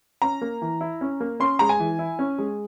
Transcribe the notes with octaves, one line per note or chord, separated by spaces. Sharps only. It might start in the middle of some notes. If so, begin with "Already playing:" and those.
C#4 A#5
A#3
E3
E4
C#4
A#3
C#4 C6
G#3 A#5
G#5
E3
E4
C#4
G#3